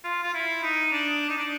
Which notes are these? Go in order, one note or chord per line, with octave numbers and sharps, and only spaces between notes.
F4
F4
E4
D#4
D4
D#4
D4